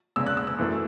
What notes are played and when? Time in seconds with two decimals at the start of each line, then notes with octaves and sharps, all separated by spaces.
0.16 E2 C#3 G#3 E6
0.26 F#6
0.37 E6
0.47 E6
0.58 F#2 E3 A3